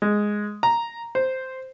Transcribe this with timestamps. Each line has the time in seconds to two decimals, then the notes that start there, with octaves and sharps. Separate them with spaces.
0.02 G#3
0.63 A#5
1.15 C5